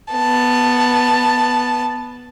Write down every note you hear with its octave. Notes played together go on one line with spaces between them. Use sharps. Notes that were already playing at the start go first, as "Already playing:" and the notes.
B3 A5